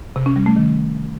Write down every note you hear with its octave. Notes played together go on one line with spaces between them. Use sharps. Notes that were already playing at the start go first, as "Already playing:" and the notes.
C3
C#4
G3
A3
D#3